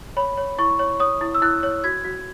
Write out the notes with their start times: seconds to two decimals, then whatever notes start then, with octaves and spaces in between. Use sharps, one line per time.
0.17 C#5 B5
0.37 C#5
0.59 E4 C#6
0.79 C#5
1.00 C#5 D#6
1.21 E4
1.34 E6
1.42 E4 F#6
1.63 C#5
1.84 F#4 G#6
2.05 F#4